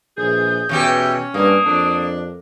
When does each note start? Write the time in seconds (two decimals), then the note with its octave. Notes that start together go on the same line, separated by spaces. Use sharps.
0.17 A#1 E3 G#4 G6
0.69 E2 B2 E3 C#4 G4
1.34 G2 A#3 D#6
1.66 F2 D4